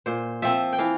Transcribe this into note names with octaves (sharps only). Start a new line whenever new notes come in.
A#2 C5
F3 C4 E5
G5
E3 F5